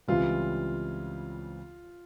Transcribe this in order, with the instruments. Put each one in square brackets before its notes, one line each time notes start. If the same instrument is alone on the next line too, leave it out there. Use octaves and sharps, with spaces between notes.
[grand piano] C#2 C#3 E3 G3 C4 [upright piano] F4